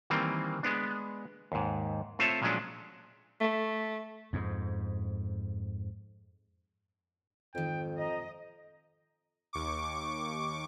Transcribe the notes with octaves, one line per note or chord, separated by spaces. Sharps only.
D#3 E3 G3 A#3 C4
G#3 B3 D4
D#2 G#2
A3 C4 F4 A4 C#5 E5
A#2 F3 F#3 G#3 C#4 D4
A3
F2 G#2
F2 G#2 D#3 G5
D#5 A#5
D#2 C#6 D6